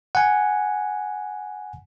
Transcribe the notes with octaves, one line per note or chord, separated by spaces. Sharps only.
F#5 G#5